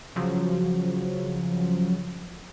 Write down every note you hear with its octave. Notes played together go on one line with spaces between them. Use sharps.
C#3 F3 F#3